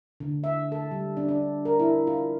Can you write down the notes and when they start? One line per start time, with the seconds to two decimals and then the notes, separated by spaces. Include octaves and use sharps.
0.20 D3
0.44 E5
0.72 A4
0.91 G3
1.17 D4
1.28 D4
1.65 A#4
1.80 E4
2.07 F4